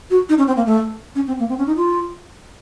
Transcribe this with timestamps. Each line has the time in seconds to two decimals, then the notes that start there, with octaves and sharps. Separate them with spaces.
0.11 F#4
0.29 D#4
0.38 C#4
0.48 C4
0.57 A#3
0.66 A3
1.15 C#4
1.27 C4
1.40 A#3
1.49 C4
1.58 C#4
1.67 D#4
1.77 F4